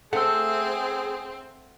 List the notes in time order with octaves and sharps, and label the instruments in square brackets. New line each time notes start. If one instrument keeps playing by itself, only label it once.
[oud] A3 [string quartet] C4 [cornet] G#4 [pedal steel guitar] F#5 E6